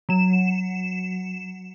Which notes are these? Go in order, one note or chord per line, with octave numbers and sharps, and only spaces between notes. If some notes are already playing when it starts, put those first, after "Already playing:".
F#3 E7